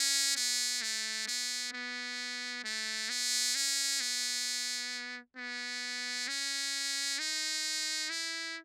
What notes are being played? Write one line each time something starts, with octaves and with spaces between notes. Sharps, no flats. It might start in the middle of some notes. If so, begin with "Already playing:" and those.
Already playing: C#4
B3
A3
B3
B3
A3
B3
C#4
B3
B3
C#4
D#4
E4